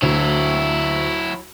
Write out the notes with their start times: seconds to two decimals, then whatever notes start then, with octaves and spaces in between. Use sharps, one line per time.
0.02 D2 F#3 E4